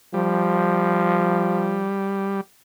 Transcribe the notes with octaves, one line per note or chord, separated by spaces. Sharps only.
F3 G3